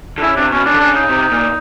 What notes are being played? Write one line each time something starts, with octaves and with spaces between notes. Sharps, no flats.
D3
C#3 E4
C3 D4
B2 C#4
C#3 D4
D3
C#3 D4
D#4
C3
A#2